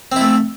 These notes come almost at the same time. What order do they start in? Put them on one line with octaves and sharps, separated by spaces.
C4 E4 A3